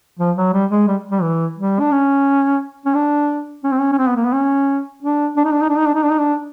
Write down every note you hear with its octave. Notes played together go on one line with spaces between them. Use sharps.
F3
F#3
G3
G#3
G3
G3
E3
G3
D4
C#4
C#4
D4
C#4
C4
C#4
C#4
C4
B3
A#3
B3
C#4
D4
D4
D#4
D4
D#4
D4
D#4
D4
D#4
D4
D#4
D4